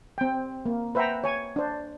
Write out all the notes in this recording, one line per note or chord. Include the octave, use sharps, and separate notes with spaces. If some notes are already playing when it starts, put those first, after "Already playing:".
C4 G5
A#3
B4 C5 E5 F#5 G5 A#5
C#5 G#5
D4 C5